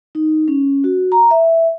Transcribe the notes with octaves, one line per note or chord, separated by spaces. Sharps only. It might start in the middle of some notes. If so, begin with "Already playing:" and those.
D#4
C#4
F#4
A#5
E5